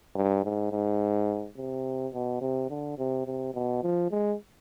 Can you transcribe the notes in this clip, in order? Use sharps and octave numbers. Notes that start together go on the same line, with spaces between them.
G2
G#2
G#2
C3
B2
C3
D3
C3
C3
B2
F3
G#3